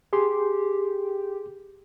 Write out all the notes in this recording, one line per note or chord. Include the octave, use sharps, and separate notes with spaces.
G4 G#4 C6